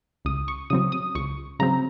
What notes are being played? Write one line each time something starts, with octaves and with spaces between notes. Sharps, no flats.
C#2 D#6
C#6
C#3 F#3 C4 D#6
D#6
C#2 C#6
C#3 F#3 C4 A#5